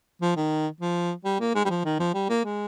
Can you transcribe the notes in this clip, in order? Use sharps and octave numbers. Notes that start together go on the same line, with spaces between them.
F3
D#3
F3
G3
A#3
G#3
G3
F3
D#3
F3
G3
A#3
G#3